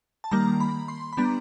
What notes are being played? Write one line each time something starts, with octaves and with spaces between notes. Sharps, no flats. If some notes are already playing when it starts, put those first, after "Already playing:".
A5
D#3 G3 A#3 A#5
B5
C6
B5
G3 B3 D4 A#5